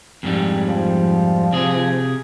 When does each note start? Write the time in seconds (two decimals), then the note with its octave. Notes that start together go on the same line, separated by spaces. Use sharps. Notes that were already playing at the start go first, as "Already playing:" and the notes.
0.23 F2 G#2 G3
0.67 F3
1.53 C3 G#4